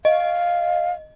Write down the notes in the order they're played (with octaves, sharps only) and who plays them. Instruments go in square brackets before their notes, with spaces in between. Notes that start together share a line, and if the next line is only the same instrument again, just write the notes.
[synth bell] D#5 [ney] F5